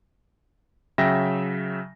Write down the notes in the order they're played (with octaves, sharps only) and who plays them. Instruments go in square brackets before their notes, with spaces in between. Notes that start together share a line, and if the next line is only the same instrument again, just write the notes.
[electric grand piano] C#3 F#3 E5 G5 A#6